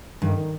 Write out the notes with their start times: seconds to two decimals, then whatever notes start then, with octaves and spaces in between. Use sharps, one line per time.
0.21 G2 D#3
0.37 D#3